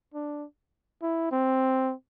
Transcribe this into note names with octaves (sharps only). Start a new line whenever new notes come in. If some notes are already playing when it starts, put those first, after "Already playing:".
D4
E4
C4